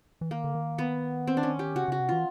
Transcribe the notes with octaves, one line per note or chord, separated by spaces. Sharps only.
E3
D#3 A#3
D3
D#3
B3
C4
D4
C#4
G4
C#3 F#4
C#3 F#4
C3
E3 F4